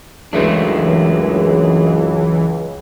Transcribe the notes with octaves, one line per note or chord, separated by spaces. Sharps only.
C#2 F#2 E3 G#3 A3 D4